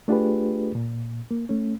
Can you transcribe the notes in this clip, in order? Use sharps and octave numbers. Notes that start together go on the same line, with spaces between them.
A3 D4 F4 G4 G#4 B4
A#2
A#3
A3 C#4